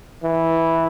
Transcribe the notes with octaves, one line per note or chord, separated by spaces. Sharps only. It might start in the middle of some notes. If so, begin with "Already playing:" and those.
E3